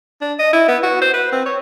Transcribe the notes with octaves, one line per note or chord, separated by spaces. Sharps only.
D4
D#5
E4
B3
F#4
C5
B4
C4
C#5